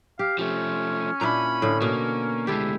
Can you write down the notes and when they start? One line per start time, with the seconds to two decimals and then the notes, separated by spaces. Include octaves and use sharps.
0.19 G4 F5
0.39 F3 A3 C#4
1.21 A#2 D4 E4 A#5 B5
1.62 A2 D3
1.82 B2 A#3
2.47 D2 G#3 E4 G4 A4